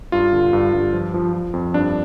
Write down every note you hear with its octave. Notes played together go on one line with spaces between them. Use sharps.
G2 F4
D3
G2
G2
F3
F3
F3
F2
G2 D4